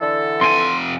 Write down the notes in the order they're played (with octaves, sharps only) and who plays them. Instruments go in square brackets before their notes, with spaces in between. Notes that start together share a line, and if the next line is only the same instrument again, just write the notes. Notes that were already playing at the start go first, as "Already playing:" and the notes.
[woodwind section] D3 E3 A4
[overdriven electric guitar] F2 G#5 [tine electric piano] C6